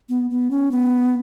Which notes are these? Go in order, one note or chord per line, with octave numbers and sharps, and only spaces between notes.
B3
B3
C#4
B3